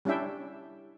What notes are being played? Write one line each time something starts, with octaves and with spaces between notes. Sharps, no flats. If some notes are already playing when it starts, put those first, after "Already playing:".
G3 C#4 D4 E4 E5 G5